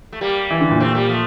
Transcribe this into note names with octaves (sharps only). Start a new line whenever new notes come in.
A3
G3 A#3
E3
D3
A#2
A3 C4
G3 A#3
F3 A3